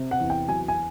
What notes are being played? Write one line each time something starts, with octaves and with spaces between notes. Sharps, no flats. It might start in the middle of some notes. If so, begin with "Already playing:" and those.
Already playing: C3
F#5
E2
G5
F#3 G#5
G#5